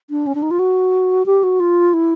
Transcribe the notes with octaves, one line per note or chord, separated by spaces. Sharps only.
D4
C#4
D4
D#4
F4
F#4
G4
F#4
F4
E4